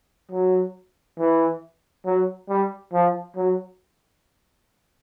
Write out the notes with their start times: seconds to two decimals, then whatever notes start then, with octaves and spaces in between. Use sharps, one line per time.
0.32 F#3
1.19 E3
2.06 F#3
2.49 G3
2.93 F3
3.36 F#3